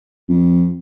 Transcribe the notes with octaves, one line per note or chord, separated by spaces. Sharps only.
F2